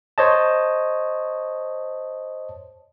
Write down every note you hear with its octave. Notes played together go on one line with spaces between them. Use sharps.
C5 C#5 D#5 A5